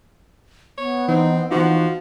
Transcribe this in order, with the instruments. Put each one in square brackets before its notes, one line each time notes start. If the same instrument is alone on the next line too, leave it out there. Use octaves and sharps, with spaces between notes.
[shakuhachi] B3 [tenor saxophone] C#5
[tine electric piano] E3 [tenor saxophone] C4 [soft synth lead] D#4
[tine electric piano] E3 D#4 [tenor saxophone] F3 [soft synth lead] F#4